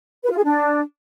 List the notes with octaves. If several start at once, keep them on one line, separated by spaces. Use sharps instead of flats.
B4
F4
G#4
D4